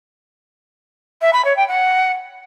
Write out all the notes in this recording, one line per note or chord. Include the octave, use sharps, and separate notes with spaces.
E5
B5
C#5
G5
F#5